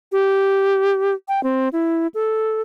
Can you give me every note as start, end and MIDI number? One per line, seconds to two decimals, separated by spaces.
0.12 1.14 67
1.28 1.43 79
1.43 1.69 60
1.73 2.07 64
2.14 2.62 69